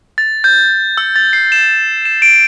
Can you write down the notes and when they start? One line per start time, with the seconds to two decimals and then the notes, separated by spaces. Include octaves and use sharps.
0.18 A6
0.44 G6
0.98 E6
1.16 A6
1.33 C7
1.52 E7
2.05 E7
2.22 D7